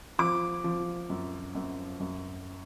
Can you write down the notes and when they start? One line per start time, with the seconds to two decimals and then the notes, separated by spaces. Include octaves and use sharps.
0.19 F3 D6
0.64 F3
1.10 F#2
1.55 F#2
2.00 F#2